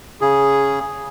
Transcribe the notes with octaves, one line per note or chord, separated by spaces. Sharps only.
C#3 G#4